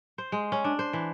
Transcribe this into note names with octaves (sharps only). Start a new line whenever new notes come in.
C5
G#3
C#4
D4
C5
E3